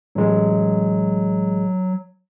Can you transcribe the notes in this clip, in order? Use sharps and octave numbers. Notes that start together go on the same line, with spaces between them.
A1 F#3 G#3